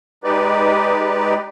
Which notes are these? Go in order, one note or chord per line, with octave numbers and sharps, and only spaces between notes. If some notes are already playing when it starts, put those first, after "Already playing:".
G#3 D#4 G4 B4 D5